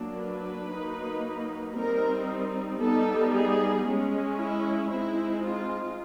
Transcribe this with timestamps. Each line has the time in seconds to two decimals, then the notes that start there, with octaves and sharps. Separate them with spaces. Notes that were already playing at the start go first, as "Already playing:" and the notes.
Already playing: F#3 A#3 D4
0.19 B4
0.72 F#3 A#3 D#4
1.77 G3 C4 D#4 A#4
2.81 G3 B3 D#4 A4
3.33 G#4
3.86 G#3 C#4
4.38 E4
4.90 G#3 C4 D#4 E4
5.43 F4